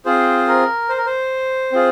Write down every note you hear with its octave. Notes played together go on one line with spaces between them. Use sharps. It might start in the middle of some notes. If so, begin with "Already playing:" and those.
C4 F4 G#4 C5
A#4
C5
A#4
C5
C4 F4 G#4